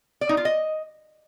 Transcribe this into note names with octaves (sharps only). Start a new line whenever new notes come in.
D5
D#4
F4
D#5